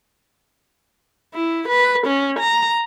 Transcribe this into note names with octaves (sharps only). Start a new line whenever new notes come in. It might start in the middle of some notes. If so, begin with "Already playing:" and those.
E4
B4
C#4
A#5